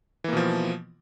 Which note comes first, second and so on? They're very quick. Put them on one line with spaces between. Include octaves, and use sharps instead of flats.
E3 A#3 B2 F3